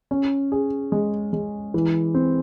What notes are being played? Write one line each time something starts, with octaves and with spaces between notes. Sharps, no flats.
C#4
G#4
G#3
G#3
E3
C4